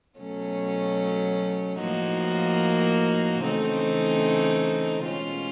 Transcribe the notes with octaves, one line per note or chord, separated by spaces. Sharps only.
B2 F#3 A3 C#4
A2 F3 A#3 D#4 F#4
C#3 E3 A3 C4 D#4
B2 G#3 C#4 F4